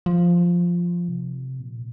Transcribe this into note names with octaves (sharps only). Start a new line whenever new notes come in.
F3
C3
A#2